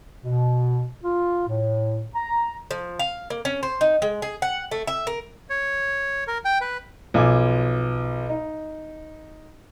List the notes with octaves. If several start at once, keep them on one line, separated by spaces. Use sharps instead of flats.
B2
F4
A2
A#5
F3
F5
A#3
C#4
C5
D#4
G#3
G#4
F#5
A3
E5
A#4
C#5
A#4
G5
B4
B1 F3 G#5 D6
D#4